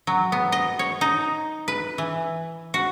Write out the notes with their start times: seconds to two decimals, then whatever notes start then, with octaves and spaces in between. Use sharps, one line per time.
0.07 F#3
0.32 B3
0.52 D#5
0.79 C#5
1.01 D#4
1.68 B4
1.98 E3
2.74 F#4